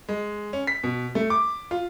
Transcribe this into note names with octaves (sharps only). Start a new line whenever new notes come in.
G#3
C#4
B6
B2
A3
D6
F4